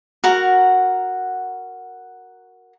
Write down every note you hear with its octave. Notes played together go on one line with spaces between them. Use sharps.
F#4 A#4 F#5